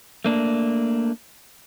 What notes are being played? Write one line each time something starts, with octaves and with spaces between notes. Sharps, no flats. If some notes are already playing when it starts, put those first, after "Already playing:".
A3 A#3 D4